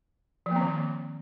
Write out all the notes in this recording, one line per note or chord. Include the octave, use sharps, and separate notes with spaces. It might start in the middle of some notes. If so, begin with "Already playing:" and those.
F3
A#3
C4
D#3